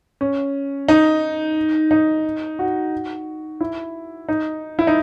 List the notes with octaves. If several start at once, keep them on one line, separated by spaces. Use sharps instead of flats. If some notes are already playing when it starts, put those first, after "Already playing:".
C#4
D#4
D#4
F#4
E4
D#4
E4
D#4